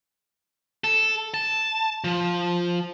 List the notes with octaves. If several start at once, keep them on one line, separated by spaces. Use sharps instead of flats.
A4
A5
F3